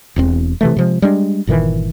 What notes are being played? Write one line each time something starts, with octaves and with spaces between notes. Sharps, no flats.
E1 E2 C4
C3 E3 A3
C3 F3 G#3
G3 G#3 D4
G1 A#2 D#3 E3